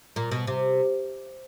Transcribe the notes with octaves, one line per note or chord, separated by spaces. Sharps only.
A#2
B2
C3